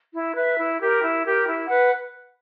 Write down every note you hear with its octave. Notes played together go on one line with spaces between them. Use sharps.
E4
B4 E5
E4
G4 A#4
E4
G4 A#4
E4
B4 F#5